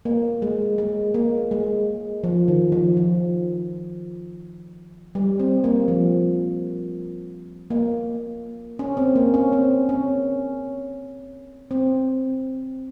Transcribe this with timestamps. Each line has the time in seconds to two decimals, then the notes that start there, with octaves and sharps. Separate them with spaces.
0.05 A#3
0.42 G#3
0.78 G#3
1.14 A#3
1.51 G#3
2.24 F3
2.48 D#3
2.72 F3
2.97 F3
5.15 G3
5.39 C4
5.64 A#3
5.88 F3
7.70 A#3
8.79 C#4
8.97 C4
9.16 A#3
9.34 C#4
9.52 C4
9.89 C#4
11.71 C4